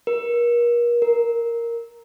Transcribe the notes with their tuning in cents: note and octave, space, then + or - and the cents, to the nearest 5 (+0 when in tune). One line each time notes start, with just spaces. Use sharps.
A#4 +35
A#4 +0